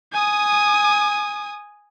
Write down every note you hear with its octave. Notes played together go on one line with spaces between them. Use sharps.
G#5 D#6